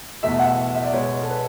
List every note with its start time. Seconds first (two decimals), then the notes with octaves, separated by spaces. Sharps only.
0.23 E2 B2 A3 E5
0.39 F#5
0.46 E5
0.74 E5
0.84 D5
0.93 B2 G#3 B3 C#5
1.22 A4
1.29 B4